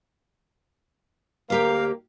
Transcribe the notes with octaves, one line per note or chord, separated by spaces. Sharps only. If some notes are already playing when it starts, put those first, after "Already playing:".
D2 A#3 G4 A#4 F5 G5